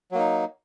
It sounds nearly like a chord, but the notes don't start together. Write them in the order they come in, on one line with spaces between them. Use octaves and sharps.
F#3 A#3 D#4